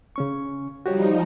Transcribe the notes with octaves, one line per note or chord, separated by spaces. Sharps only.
C#3 C#4 C#6
F3 G3 D#4 F#4 G4 C#5